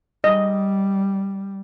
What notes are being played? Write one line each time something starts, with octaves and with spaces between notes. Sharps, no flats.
G3 D#5